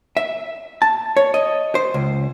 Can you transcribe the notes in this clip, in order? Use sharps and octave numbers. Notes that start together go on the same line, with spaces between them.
E5
A5
C#5
D#5
C5
C#2